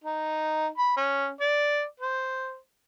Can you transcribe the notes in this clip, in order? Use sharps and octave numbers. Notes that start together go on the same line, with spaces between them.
D#4
B5
C#4
D5
C5